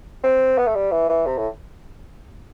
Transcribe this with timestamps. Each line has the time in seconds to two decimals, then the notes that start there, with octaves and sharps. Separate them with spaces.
0.24 C4
0.58 B3
0.67 A3
0.75 G3
0.92 E3
1.09 E3
1.26 C3
1.38 A2